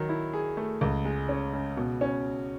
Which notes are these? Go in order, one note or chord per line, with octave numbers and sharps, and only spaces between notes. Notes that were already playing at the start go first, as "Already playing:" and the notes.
Already playing: D#3 F#3
E4
G#4
A3
C#2
G#3
C#4
C#3
B2
C#4